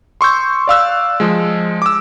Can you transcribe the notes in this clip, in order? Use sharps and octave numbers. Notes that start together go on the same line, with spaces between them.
C6 C#6 E6 G6
D5 F5 E6 F#6
F3 G#3
D6 E6